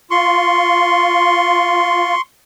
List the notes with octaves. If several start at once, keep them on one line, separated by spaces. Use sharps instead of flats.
F4 C6 C#6